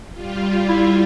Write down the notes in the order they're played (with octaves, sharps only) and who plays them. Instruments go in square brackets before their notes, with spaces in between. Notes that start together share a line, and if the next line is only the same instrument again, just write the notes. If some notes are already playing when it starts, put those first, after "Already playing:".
[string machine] G3 F4
[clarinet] E4